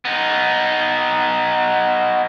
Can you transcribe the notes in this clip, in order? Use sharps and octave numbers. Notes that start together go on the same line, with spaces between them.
B3 D#4